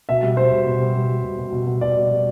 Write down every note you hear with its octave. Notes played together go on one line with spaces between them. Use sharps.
B2 E5
G3
G3 C5
B2
B2
G3
G3
G3
B2
B2
B2
B2
B2 D5
G3
G3